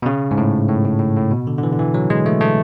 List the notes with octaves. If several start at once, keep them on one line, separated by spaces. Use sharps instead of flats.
B2
C#3
G#2
A2
A2
A2
A2
A2
B2
D3
D3
E3
D3
E3
F#3
G#3
A3
A3